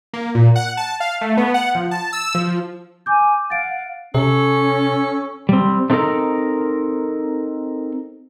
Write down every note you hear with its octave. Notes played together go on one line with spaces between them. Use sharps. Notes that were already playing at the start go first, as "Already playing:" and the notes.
A#3
A#2
F#5
A5
F5
A3
B3
F#5
F3
A5
E6
F3
G#5 D6 G6
F5 F#5 A6 D7
C3 C#4 A4
G3 C4
A3 C4 D#4 G4 A4 A#4